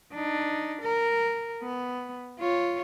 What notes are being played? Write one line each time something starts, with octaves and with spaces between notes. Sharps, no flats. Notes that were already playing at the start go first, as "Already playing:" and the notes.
D4 D#4
A#4
B3
F4 C#5